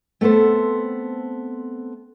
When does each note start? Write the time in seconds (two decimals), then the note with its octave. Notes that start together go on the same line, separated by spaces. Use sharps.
0.21 A3 B3 C4 A4 C5